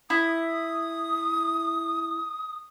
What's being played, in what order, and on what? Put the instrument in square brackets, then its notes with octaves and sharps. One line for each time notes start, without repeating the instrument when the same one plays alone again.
[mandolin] E4 [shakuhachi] D#6